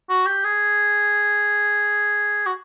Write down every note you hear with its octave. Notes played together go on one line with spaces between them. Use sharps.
F#4
G4
G#4
F#4